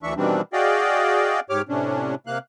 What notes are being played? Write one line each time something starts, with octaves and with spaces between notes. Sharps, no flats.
D2 E3 D4 E5 C#6
B2 D#3 E3 G3 C4 D4
F#4 G#4 D5 D#5 F5 G5
G#2 G4 C#5 D6 F6
A2 C3 C#4 D4
C3 A#3 F5 F#6